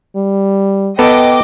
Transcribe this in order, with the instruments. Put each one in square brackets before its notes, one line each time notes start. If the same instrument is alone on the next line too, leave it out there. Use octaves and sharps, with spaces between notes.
[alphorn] G3
[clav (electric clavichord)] B3 A4 B4 [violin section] D#5 G5 D6